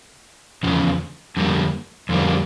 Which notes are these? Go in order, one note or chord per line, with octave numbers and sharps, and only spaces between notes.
E2 C#3 F3
F2 D3 G3 A#3
F2 D3 G3 A#3